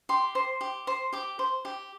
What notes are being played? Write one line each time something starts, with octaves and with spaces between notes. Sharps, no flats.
G4 C6
C5
G4
C5
G4 D6
C5
G4